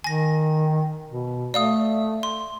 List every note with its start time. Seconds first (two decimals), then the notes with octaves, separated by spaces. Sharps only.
0.04 D#3 G#5 A#6
1.09 B2
1.54 A3 D5 F5 D#6
2.23 C6